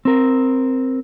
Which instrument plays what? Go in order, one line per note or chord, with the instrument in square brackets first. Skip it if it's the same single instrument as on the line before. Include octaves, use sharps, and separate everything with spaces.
[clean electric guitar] C4 A#4